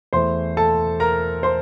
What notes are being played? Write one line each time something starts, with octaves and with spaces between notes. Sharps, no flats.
E2 E3 A3 C5 C6
A4 A5
A#4 A#5
C5 C6